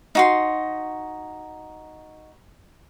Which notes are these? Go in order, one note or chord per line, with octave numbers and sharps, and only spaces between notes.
D#4 F#4 C6